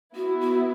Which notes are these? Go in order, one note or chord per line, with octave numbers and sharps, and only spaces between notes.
B3 E4 F#4
F#4